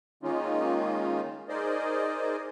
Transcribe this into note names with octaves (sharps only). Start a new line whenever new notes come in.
D#3 G#3 A#3 C#4 D#4 F4
D#4 G#4 A#4 C5 D5 D#5